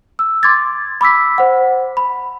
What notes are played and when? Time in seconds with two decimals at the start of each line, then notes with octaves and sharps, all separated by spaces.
0.19 E6
0.43 C6 D6 G#6 A6
1.01 B5 D6 E6 B6
1.38 C5 F#5
1.97 B5